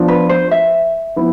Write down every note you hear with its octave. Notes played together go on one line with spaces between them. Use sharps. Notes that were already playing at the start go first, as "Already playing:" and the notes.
Already playing: F3 B3 D4 F4
B4
C5
E5
F3 B3 E4